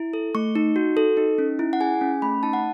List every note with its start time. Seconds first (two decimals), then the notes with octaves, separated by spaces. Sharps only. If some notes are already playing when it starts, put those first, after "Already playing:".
Already playing: E4
0.13 A4
0.35 A3 C#6
0.55 D#4
0.76 F#4
0.97 A4
1.17 D#4
1.38 C#4
1.59 E4
1.73 F#5
1.80 G#4 G#5
2.01 C#4
2.22 A3 B5
2.43 D#4 A5
2.53 F#5